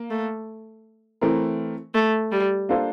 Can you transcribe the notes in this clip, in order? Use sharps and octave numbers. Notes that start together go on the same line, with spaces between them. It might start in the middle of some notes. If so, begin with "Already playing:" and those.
Already playing: A#3
A3
E3 A3 C4 E4 A#4
A3
G3
A#3 D4 F4 A4 C5